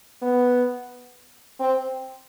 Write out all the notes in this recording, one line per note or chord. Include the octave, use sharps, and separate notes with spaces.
B3
C4